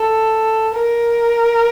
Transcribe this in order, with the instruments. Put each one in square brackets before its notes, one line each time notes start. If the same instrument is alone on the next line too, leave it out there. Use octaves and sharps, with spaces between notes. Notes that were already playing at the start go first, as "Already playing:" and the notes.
Already playing: [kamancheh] A4
A#4